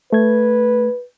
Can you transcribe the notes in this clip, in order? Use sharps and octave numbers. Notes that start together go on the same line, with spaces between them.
A3 B4 G#6